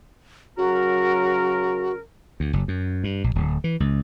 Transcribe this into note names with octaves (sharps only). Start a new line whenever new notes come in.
C#3 F#3 F#4 A#4
D2
F#1
F#2
G2
A#1
D1
E3
C#2